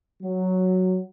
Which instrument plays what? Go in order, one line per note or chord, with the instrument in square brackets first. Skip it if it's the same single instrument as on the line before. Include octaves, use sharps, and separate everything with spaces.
[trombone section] F#3